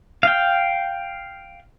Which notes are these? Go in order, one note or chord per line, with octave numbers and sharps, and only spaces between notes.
F5 G5